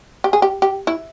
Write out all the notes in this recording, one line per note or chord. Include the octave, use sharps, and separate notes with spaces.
G4
G#4
G4
G4
E4